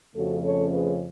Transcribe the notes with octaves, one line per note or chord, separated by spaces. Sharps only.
F2 C#3 F3 A3 C#4 F#4 A4
A4 C#5
G#4 B4